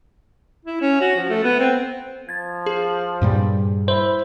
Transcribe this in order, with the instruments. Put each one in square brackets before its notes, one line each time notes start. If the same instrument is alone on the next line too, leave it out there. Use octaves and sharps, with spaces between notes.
[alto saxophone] E4
C#4
F#4
F3
A3
B3
C4
[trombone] F3 [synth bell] G#6 A6
[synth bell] G#4
[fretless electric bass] G2 A#2 G3
[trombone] E4 [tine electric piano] C5 [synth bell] G7